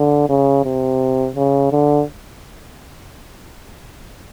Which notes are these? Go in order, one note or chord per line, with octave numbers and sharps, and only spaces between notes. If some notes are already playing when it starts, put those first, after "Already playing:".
Already playing: D3
C#3
C3
C#3
D3